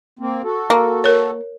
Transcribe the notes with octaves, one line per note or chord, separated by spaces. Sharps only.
A#3 C4
F#4 A4
A#3
A#4 C#5